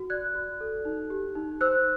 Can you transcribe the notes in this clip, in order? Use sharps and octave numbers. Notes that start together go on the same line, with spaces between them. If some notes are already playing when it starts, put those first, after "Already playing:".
Already playing: F#4
D5 F#6 G#6
F#4
A4
D#4
G4
D#4
C5 E6 F#6